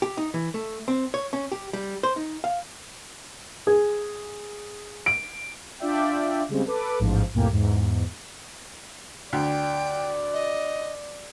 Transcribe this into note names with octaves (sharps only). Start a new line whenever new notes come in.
G4
D#4
E3
A3
C4
C#5
C#4
G4
G3
C5
D#4
F5
G#4
D7
D4 F4 D5 E5 G5
C#3 G3 G#3 C4
A4 B4 D6
A1 G#2 F3
C2 F2 A2 A#3 G4 G#5
E2 G#2
D2 D5 G5
D#5